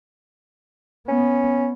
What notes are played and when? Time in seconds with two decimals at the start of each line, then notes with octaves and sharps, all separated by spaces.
1.08 B3 C#4